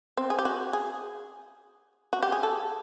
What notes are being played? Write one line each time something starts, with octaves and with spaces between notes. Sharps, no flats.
C4
G#4
G4
F#4
G#4
F#4
G4
G#4
A4